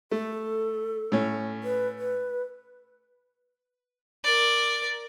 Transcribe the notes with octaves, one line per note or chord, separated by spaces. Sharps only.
A3 A4
A2 C#4
B4
B4
A#4 D5